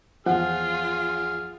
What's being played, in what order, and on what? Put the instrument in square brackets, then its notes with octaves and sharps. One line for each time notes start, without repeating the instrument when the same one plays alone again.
[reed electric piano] E2 F3 [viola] F4 [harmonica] G#4 F6 [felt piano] F#5